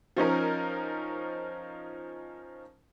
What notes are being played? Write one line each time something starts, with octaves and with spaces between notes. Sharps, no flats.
F3 C#4 D#4 A#4